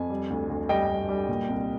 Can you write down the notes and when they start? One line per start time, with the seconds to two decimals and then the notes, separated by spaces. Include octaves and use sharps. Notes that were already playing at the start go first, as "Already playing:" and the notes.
Already playing: F2 G#5
0.10 G3
0.30 D2
0.50 D2
0.69 G3 D#5 G5
0.89 G3
1.09 G3
1.29 A#2
1.49 C2